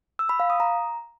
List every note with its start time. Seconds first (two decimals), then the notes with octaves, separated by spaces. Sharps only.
0.19 E6
0.29 B5
0.40 F5
0.50 D#6
0.60 A#5